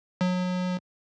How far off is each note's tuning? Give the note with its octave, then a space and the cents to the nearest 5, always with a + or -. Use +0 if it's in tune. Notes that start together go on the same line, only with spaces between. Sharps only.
F#3 -30